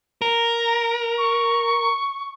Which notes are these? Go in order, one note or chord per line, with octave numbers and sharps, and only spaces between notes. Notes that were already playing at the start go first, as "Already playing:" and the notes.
A#4
C#6